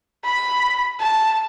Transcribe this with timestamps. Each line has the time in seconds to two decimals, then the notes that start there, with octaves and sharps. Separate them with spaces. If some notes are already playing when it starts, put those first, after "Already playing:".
0.24 B5
1.00 A5